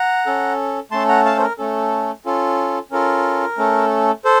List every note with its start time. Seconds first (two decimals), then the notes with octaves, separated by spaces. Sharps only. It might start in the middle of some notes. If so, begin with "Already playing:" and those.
Already playing: F#5 A#5
0.26 C#4 A4
0.91 A3 C#4 A4 A5 C6
1.08 F#5 A#5
1.25 F5 A5
1.37 C5
1.41 A#4
1.58 A3 C#4 A4
2.26 C#4 F4 A4
2.91 C#4 F4 A4 A#4
3.58 A3 C#4 A4
4.25 A4 C5